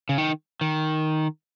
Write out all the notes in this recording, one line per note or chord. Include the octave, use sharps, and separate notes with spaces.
C#3
D#3
D#3